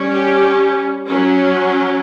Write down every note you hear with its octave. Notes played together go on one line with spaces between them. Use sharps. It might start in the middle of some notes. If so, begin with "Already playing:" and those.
Already playing: G3 C#4
G4
F#3 C#4